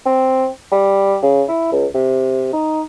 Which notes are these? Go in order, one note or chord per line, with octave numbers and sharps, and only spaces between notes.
C4
G3
C#3
E4
C#2
C3
D#4